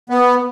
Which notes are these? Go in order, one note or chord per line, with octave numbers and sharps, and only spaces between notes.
B3